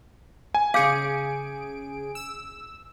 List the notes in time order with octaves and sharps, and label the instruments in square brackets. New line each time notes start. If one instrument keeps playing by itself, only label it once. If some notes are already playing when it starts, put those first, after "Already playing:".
[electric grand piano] G#5
[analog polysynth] C#3 G#4 D7 [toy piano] F5 [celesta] D6 G6 C#7
[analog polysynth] E6